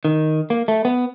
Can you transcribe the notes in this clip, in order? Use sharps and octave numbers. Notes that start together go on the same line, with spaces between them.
D#3
A#3
A3
B3